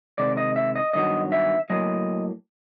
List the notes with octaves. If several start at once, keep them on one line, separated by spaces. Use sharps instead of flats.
C3 D#3 G#3 D5
D#5
E5
D#5
G2 D#3 F#3 B3 D#5
E5
A2 F#3 A#3 D#5